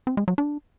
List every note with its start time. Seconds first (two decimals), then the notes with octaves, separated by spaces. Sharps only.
0.07 C4
0.17 G#3
0.28 F#3
0.38 D4